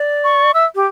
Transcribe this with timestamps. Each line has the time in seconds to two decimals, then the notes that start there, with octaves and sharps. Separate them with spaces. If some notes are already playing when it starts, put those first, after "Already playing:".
Already playing: D5
0.24 C#6
0.54 E5 E6
0.75 G4